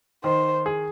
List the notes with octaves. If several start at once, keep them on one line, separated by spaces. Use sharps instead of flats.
D#3 C5
G#4